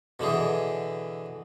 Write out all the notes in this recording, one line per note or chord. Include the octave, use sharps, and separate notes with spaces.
B2 D3 E3 G#4